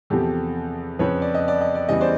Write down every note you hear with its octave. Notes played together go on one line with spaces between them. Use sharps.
E2 C3 F3 G4 A4
F2 C#3 F3 B4 C#5
D5
D#5
D5
D#5
D5
E2 C#3 E3 G3 D#5
C5 D5